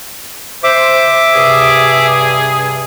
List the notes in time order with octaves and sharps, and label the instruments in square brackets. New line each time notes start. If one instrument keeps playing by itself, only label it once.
[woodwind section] C5 [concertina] E5 D6
[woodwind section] G2 C3 G#4